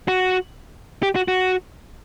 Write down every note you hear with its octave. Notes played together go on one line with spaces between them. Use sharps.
F#4
G4
F#4
F#4